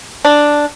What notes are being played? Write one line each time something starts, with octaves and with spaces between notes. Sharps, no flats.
D4